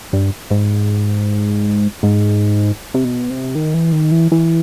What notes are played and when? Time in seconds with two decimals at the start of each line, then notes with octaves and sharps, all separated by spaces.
0.13 G2
0.50 G#2
2.03 G#2
2.94 C3
3.05 B2
3.30 C3
3.55 D#3
3.74 E3
3.92 D#3
4.11 E3
4.32 E3